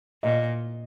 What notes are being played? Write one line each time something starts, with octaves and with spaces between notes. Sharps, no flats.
A#2 D#5